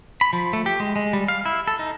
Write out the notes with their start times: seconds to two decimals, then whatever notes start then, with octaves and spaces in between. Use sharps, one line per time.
0.21 B5
0.33 F3
0.53 A3
0.66 G4
0.80 G#3
0.96 G#3
1.13 G3
1.28 F5
1.46 E4
1.68 A4
1.79 D#4